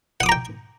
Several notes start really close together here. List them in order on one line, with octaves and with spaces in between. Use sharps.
F#5 D#6 D6 A#5 G5